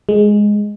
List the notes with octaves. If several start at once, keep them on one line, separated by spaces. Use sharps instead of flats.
G#3